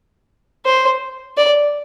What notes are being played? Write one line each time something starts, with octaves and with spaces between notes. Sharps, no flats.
C5
D5